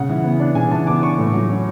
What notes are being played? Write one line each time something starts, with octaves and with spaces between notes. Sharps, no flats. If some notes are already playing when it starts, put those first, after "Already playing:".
Already playing: C#3 F#5
E3
B3
D4
C#3 G#5
E3 A5
B3 D6
D4 C#6
A2
F#3
C#4